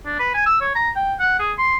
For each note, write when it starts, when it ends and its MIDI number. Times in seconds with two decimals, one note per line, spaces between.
0.05 0.18 62
0.19 0.32 71
0.34 0.45 80
0.46 0.57 88
0.61 0.73 73
0.75 0.90 82
0.96 1.14 79
1.20 1.38 78
1.39 1.52 68
1.58 1.77 84